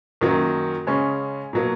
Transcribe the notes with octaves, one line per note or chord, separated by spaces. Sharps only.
F#2 D#3 F#3 A#3
C#3 G#3 C#4
B2 F#3 A#3